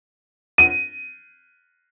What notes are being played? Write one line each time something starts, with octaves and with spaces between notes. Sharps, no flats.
D#7